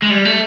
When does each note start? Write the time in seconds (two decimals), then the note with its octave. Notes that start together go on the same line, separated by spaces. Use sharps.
0.02 G#3
0.10 G3
0.25 A3